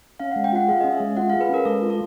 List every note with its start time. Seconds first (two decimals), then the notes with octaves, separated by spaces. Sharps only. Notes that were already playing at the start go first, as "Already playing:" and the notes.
0.20 C#4 F5
0.31 F#5
0.36 G#3
0.44 G5
0.53 F4 F#5
0.68 G#4 F5
0.81 D#5
0.84 C#4
0.92 E5
1.00 G#3
1.17 F4 F#5
1.30 F5
1.33 G#4
1.41 B4
1.49 C#4 A#4
1.65 G#3 A4
1.82 F4
1.90 A4